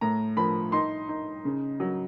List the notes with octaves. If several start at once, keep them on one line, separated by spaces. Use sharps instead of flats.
A2 A#5
F3 B5
D#4 C6
D#4
C#3
F#3